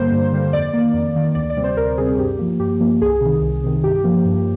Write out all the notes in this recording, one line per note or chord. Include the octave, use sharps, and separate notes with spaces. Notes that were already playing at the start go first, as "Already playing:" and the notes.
Already playing: G2 D3 G3 A#3 C5
G2
D3 G3 A#3
F2 D5
D#3 A#3
F2
D#3 A#3
D2 D5
D5
C3 G3 C4
C5
D2 A#4
C3 G3 C4 G#4
G2 G4
F3 A#3
G2 G4
F3 A#3
C2 G#4
C3 D#3
C2
C3 D#3
G2 G4
F3 A#3
G2